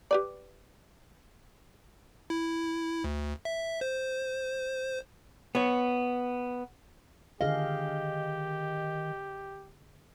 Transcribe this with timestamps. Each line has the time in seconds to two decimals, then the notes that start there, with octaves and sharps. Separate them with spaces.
0.11 G4 B4 D5
2.30 E4
3.04 D2
3.45 E5
3.81 C5
5.55 B3 C#5
7.41 D3 D#3 G4 G#4 D#5 F5